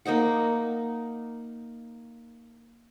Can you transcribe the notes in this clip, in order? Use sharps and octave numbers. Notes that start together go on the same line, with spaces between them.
A#3 D#4 D#5 F#5